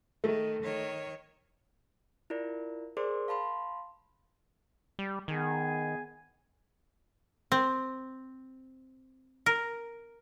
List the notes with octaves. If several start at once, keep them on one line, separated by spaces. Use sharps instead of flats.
D#3 A3
D#3 C#5
E4 F4 A#4 D5
G#4 A#4 C5 D5 C6 D6
F5 A5 B5 C6
G3
D#3 B3 G#4 G#5
C4
A#4